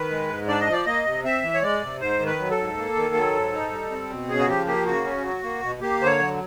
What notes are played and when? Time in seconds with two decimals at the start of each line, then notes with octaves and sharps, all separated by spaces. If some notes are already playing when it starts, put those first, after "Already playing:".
Already playing: D#3 B4
0.10 G#3
0.29 G#2
0.48 D4 D5
0.60 D#5
0.67 F3
0.73 D5
0.86 A#3 D#5
1.05 C3
1.24 C4 E5
1.43 E3
1.54 C#5
1.63 G#3 D5
1.82 C3
2.00 G#2 C5
2.19 D#3
2.26 B4
2.39 F#3
2.51 A4
2.57 G#2
2.77 A#3
2.95 D#3
3.14 F#3
3.33 G#2
3.53 D#4
3.71 G3
3.91 C4
4.10 B2
4.29 C#3 G#4
4.39 F#4
4.48 F3 G4
4.66 A#3 G4
4.86 C#3 F#4
5.05 C#4
5.24 F#3
5.43 A#3
5.62 B2
5.81 A#3 G4
6.01 D3 C5
6.06 C#5
6.19 F#3